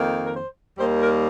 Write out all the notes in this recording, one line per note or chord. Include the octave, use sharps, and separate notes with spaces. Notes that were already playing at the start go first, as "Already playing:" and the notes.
Already playing: F2 D#3 A#3
A#4
C5
D#2 D#3 G3 A#3 C5
A#4